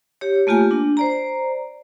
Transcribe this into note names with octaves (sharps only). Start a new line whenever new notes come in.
G4 C#5
A3 A#3 F4 G4 G#5
D4
C5 D5 A#5